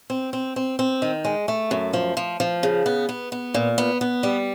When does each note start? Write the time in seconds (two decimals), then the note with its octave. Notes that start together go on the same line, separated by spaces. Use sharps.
0.10 C4
0.33 C4
0.56 C4
0.79 C4
1.02 D#3
1.25 G#3
1.48 A3
1.71 F#2
1.93 F3
2.17 F3
2.40 F3
2.63 C#3
2.86 B3
3.09 B3
3.32 B3
3.54 A#2
3.78 B3
4.01 B3
4.23 G3